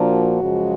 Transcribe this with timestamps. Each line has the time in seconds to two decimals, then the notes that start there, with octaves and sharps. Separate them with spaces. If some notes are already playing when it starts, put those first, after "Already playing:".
Already playing: A#2 F3 A#3 D4 F#4
0.42 F#2 C#3 F3 G#3